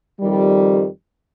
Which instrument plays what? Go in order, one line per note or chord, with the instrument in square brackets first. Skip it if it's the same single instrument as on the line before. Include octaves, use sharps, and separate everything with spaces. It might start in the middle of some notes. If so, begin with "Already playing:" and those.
[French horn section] F2 D#3 G3